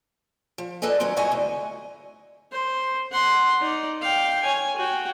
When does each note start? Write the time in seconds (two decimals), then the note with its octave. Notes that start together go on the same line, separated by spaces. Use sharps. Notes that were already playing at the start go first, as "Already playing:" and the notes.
0.58 F3
0.82 A4 B4 D5 D#5 G#5
1.00 D#3 F#3 C4 C#4 C#5
1.17 G2 B2 E4 C#5 D#5 G#5
1.31 D2 G#2
2.52 C5
3.11 F#5 C6
3.60 D#4 D5
4.02 F5 G5
4.43 C#5 G#5
4.76 F#4 G5